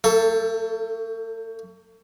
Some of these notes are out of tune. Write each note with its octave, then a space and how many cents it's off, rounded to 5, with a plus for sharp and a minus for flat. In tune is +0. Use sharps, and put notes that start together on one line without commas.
A3 +40 A4 +0